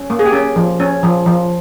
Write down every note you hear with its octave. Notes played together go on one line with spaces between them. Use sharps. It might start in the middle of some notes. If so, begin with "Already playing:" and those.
Already playing: C#4
A#3
G#4
G4
C#4
F3
C#4
F3
F3